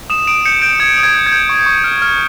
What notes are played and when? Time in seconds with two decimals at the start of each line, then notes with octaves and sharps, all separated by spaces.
0.10 D#6 E7
0.27 D#6 D7
0.45 G6 C#7
0.62 G6 D7
0.80 D#6 G#6
0.97 D#6
1.03 G#6
1.15 G6
1.27 G#6
1.32 G6
1.49 C#6
1.66 C#6
1.84 F6
2.02 F6